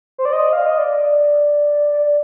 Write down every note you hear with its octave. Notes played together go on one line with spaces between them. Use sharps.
C5
D5
D#5
F5
D#5
D5